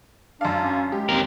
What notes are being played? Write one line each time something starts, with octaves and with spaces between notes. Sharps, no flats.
F#2 D4 F5
C#4
G#3 G4
D#2 C4 A#4